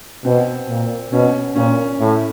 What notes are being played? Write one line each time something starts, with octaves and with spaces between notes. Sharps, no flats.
B2 C4
A#2
B2 C#4
A#2 C#4
A2